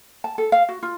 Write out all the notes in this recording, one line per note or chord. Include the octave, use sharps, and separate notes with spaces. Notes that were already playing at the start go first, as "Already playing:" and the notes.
A5
A4
F5
F#4
F4